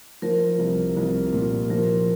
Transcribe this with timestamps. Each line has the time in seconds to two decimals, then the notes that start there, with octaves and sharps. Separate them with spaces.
0.22 F3 A#4
0.59 C2
0.97 C2
1.33 A#2
1.70 F3 A#4